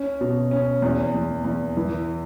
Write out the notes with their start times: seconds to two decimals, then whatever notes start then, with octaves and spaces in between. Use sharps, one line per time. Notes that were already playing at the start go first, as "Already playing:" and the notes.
Already playing: C#4
0.21 B2
0.51 C#4
0.82 E2
1.14 E2
1.44 E2
1.77 E3